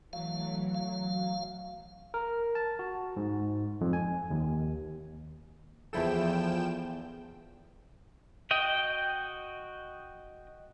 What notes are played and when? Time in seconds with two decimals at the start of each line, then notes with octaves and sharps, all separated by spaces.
0.13 E3 F#3 A3 F5
0.74 F5
2.14 A#4
2.55 A5
2.79 F#4
3.17 G#2
3.81 F2
3.93 G#5
4.31 D#2
5.93 E2 F3 E4 A4 G5 E7
8.51 F#4 D#5 G5